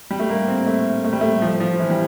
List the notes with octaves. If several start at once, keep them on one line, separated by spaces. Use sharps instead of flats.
G3
A3
A#3
C4
A3
A3
G3
A3
F3
F3
E3
G3